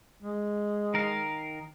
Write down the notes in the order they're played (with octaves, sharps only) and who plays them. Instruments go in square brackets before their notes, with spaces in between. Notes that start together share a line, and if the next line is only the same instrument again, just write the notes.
[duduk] G#3
[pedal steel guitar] D#3 A#4 F5